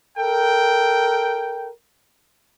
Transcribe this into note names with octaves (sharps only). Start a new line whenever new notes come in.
A4 A#4 G5